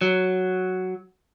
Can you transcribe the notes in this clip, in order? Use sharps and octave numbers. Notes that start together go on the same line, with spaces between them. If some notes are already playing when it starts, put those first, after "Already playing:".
F#3